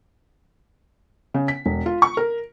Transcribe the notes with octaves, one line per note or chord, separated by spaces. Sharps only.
C#3
B6
E1
F4
C#6
A#4